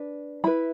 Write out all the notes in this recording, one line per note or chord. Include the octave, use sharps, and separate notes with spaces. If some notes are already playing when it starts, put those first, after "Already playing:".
Already playing: D4 B4
E4 B4 B5